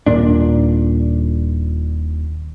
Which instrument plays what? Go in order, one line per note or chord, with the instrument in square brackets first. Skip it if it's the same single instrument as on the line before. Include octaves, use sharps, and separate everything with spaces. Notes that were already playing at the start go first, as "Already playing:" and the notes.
[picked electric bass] D#1 A#2 D4